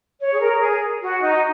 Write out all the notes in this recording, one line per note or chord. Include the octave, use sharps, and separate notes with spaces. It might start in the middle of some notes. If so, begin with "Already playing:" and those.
C#5
G#4
A#4
G#4
F#4
D#4